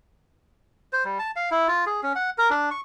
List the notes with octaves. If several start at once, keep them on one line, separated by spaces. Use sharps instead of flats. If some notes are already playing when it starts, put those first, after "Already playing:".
C5
G3
A5
F5
E4
F4
G#4
C#4
F#5
A#4
D4
C#6